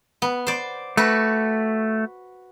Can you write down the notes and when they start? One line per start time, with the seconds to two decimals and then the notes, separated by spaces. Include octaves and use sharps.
0.22 B3
0.47 C5 D5
0.97 A3 F#4 B4